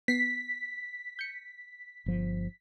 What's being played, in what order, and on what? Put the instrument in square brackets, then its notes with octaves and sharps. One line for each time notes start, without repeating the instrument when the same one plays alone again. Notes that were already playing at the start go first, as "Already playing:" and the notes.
[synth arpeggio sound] B3 C7 [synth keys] B6
[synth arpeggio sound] G6 C#7
[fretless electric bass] G1 F3